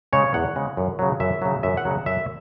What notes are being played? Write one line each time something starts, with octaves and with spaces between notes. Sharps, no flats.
C#3 G#3 C#5
E2 F#5
C#3 G#3
F#2
C#3 F#3
F#2 E5
C#3 F#3
F#2 E5
F#5
C#3 F#3
F#2 E5